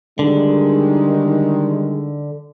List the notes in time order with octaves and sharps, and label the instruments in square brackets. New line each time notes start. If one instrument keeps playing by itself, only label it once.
[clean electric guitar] D3 [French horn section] D#3 G3 G#3